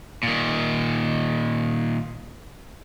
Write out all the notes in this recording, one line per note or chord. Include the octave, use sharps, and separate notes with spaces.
A#2 D#3